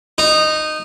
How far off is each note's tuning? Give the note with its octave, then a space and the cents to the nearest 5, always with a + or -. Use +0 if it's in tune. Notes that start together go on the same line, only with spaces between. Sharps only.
D#4 -15